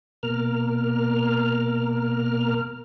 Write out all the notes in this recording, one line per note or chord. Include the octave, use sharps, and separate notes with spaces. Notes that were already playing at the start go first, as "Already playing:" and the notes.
B2 A#3 A#4 F6